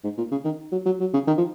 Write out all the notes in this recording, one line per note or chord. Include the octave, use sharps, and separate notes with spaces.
G#2
A#2
C#3
D#3
F#3
F#3
F#3
C#3
D#3
F3